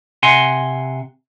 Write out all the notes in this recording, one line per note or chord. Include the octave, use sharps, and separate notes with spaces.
C3 F#5 G#5 C6